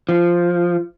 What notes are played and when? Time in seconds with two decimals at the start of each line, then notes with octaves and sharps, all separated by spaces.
0.09 F3